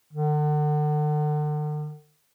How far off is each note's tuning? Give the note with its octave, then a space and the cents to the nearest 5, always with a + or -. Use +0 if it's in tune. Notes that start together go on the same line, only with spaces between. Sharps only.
D3 +40